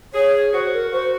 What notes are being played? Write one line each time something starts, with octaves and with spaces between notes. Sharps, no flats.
G#4 C#5
F#4 C5
A#4
F#4 C5